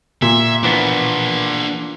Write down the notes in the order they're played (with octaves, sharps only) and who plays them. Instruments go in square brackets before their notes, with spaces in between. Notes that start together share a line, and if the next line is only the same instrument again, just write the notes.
[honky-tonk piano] A#2 [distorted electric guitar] E5
[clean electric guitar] E3 F3 B3 [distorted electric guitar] D4 A#4